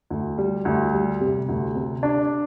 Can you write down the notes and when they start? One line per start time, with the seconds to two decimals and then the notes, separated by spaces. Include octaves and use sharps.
0.10 D2
0.38 G3
0.65 D2
0.93 G3
1.21 C3
1.49 D2
1.75 C3
2.03 D4